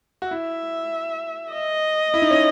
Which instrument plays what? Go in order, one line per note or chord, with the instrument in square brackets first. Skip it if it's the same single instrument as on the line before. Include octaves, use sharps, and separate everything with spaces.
[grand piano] F#4
[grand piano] E4 [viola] E5
[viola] D#5
[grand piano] E4
D#4
C#4